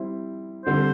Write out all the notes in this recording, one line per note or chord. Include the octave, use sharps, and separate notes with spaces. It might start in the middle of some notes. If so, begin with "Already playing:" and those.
Already playing: G3 C4 E4
D3 G3 C4 C5